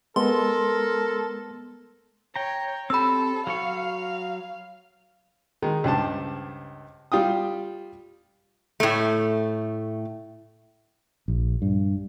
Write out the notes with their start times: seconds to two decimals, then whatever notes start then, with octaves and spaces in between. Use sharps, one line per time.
0.16 G#3 B3 A4 A#4 C6
2.36 C#5 G5 A#5
2.90 C4 G4 A4 B5 E6
3.47 F#3 F#4 F5 C#6
5.62 D#3 G#3
5.84 C#2 G2 C5 A5
7.12 G3 F4 G5 D#6
8.80 A2 A3
11.28 A#1
11.62 G2